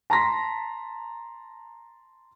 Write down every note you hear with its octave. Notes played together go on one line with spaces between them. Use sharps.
A5 A#5 C6 A#6 B6